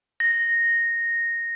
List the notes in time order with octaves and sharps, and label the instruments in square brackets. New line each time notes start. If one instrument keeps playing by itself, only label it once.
[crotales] A#6